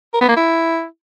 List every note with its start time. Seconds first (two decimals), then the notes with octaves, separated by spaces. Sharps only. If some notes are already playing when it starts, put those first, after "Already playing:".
0.14 A#4
0.21 B3
0.29 A#3
0.36 E4